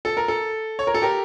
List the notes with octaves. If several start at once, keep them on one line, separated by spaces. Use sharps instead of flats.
A4
A#4
A4
C#5
A#4
A4
G4 A#4